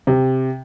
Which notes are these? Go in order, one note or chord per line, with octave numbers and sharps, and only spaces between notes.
C3